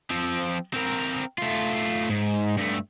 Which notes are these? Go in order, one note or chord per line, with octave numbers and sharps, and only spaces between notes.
F3 C4
C4 A#4
A3 F4
G#2
G2 A3